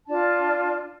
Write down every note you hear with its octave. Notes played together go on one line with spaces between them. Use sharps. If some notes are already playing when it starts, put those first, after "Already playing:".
D4 F4 A5